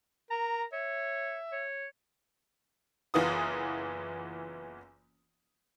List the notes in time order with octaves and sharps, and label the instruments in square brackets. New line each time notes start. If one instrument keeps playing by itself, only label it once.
[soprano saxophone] A#4 [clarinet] A#5
[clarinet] C#5 [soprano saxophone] E5
[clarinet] C#5
[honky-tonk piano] F#1 E3 B3 F4 D#6